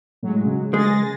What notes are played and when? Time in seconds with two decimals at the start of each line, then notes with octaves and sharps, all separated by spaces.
0.23 A2 F#3 G#3
0.45 C#3
0.74 G#3 G#5 A6 A#6